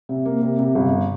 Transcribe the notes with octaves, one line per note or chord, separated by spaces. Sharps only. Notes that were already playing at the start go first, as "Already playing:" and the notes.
C3
A#3
C3
C3
G1